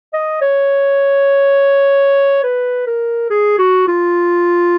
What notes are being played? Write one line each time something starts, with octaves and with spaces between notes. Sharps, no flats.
D#5
C#5
B4
A#4
G#4
F#4
F4